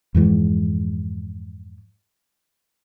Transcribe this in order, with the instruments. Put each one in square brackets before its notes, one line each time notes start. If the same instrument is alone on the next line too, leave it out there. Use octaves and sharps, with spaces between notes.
[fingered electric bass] F2 G#2 E3 G#3